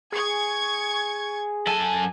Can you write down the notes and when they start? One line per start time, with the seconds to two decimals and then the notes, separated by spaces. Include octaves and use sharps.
0.12 G#4 C#6 G#6
1.67 F#2 A4 G#5